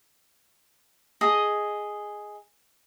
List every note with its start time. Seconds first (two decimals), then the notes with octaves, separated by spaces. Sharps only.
1.21 G#4 D#5